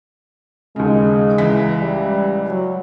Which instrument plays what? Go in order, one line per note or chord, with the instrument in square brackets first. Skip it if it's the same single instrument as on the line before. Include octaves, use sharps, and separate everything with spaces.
[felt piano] D#2 C#3 [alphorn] G#3
[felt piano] C#2 E3 B6
[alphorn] G3
F#3